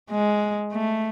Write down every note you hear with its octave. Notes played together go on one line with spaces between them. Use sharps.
G#3
A3